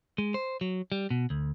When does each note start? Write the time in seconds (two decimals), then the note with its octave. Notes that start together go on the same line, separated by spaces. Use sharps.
0.18 G#3
0.34 C5
0.61 F#3
0.92 G3
1.11 B2
1.30 D2